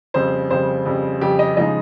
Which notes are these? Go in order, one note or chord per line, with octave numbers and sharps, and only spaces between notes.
F2 C#3 G3 C5
F2 C#3 G3 C5
F2 C#3 G3
F2 C#3 G3 G4
D#5
C#3 F3 G#3 D#4 D#5